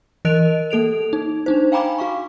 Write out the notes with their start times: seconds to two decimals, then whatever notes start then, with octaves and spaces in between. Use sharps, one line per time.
0.25 E3 A#4 D#5 F#6 D7 F7
0.71 A#3 A4 D7 F7
1.13 D#4
1.46 D4 D#4 C5
1.72 F5 G5 G#5 A#5 B5 D6
1.98 F#4 F5 C#6